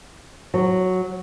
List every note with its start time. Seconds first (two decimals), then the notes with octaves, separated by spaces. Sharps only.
0.54 F#3